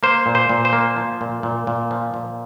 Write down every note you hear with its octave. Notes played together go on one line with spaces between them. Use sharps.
A#3 C5
A#2
C5
A#2
C5
A#3
F3
A#2
A#2
A#2
F3
A#2